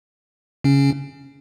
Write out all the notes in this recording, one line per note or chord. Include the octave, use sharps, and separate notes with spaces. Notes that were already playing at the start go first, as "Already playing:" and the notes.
C#3 C#4